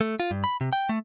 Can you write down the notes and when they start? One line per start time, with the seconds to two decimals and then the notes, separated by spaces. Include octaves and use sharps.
0.01 A3
0.20 F4
0.31 G2
0.44 B5
0.61 C3
0.73 G5
0.89 A3